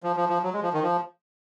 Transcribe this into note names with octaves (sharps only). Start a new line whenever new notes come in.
F3
F3
F3
F#3
G#3
F3
D#3
F3